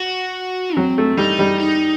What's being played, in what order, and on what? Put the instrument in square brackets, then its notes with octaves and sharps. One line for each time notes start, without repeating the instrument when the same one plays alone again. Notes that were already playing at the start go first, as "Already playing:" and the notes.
Already playing: [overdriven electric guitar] F#4
[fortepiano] F#3 [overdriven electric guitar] C4
[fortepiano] A3
[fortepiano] G3 [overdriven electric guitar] D#4
[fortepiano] G3
[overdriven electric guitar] D#4